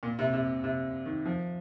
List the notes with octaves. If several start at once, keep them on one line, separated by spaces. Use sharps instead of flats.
A#2
C3
C3
C3
D#3
F3